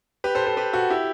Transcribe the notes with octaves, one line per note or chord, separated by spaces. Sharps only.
G4 B4
A4 C5
A4 C5
G4 B4
F#4 A4
E4 G4